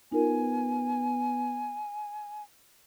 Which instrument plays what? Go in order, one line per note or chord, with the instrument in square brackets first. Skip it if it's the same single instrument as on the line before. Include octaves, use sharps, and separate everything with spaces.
[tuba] B3 [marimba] D#4 F4 A#4 [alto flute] G#5